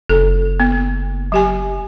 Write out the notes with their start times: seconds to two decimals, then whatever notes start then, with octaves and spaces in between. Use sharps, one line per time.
0.09 F#1 A4
0.60 B3
1.32 F#3 G4 G#5